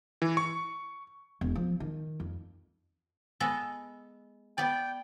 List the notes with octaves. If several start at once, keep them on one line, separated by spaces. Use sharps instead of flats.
E3
C#6
E1
F3
D#3
F2
G#3 B3 A4
B3 D5 G5